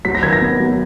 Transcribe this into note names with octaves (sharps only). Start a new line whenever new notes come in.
F#3 B6
A#6
D#3 G#6
A#6
B3
F#3